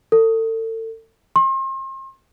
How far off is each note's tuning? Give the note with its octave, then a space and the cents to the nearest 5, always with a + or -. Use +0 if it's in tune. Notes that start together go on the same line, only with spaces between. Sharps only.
A4 +35
C6 +40